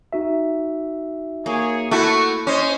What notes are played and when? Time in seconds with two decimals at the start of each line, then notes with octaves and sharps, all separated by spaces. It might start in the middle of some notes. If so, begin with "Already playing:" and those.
0.13 D#4 F#4 E5
1.46 A#3 G#4 C#5
1.91 A3 E4 F#4 C#6
2.47 C#4 C5 D#5